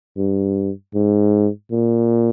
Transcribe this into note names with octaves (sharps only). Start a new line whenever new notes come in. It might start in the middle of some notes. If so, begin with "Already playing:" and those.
G2
G#2
A#2